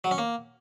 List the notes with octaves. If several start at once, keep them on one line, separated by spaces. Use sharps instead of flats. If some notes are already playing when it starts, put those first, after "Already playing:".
F#3
C#4
A#3